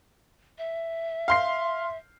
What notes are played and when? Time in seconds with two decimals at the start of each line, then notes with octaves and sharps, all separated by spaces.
0.58 E5
1.28 F5 C6 C7